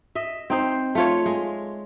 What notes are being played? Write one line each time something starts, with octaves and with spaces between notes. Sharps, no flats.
D#5 E5
C4 D#4 C5
A3 F4 C#5
G#3